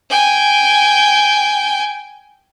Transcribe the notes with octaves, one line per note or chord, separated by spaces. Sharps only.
G5 G#5